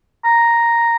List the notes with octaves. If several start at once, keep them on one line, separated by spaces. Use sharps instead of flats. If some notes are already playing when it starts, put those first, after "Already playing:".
A#5